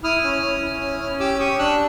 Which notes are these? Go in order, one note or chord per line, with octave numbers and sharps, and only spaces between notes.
E4 D#6 F6
C#4
C#4
E4
C#4
C#4
G4 D6 E6
G4 C#6 D#6
D4 E6 F#6